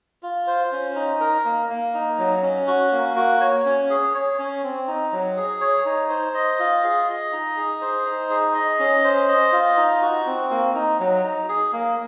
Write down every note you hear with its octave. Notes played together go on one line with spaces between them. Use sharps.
F4
C5
C#4
D#4
A#4
A#3
A#3
D#4
F#3
C#4
F#4
A#3
F#4
C#5
C#4
G#4
C#5
C#4
C4
D#4
F#3
G#4
C#5
D#4
C5
D#5
F4
G#4
D#5
D#4
G#4
C5
D#4
G#4
D#5
C#4
C5
D#5
F4
D#4
F#4
C4
A#3
D#4
F#3
D#4
G#4
A#3